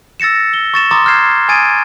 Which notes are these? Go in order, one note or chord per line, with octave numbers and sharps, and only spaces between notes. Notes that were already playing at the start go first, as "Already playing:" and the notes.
E6 A6 A#6 C#7 E7
G7
C#6 A6 E7
A#5 C6 D6 D#6 A6
F6 G6 G#6 C7 E7
G#5 D#6 G#6 A6 D7 D#7